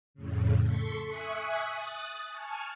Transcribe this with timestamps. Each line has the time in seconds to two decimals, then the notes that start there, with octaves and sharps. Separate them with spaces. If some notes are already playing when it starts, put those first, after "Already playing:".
0.14 F2 A2 C#3
0.64 A4 C6 C#6 B6 C#7
1.07 E5 G#5 C#6 D#6 F#6 B6
1.67 D#6 F#6 A6
2.27 G#5 A5 C#6 F6